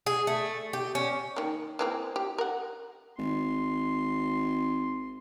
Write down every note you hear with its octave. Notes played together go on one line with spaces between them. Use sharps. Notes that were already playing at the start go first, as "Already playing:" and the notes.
G#4
A3
G4
C#4
D#3 A#3
E3 A#3 C4
G4
A#4 F#5
G#1 C6